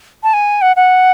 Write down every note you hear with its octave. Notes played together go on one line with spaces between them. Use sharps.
A5
G#5
F#5
F#5